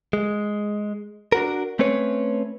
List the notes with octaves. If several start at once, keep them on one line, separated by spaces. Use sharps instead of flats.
G#3
D4 F#4 A#4
A3 C4 C#4 B4 C#5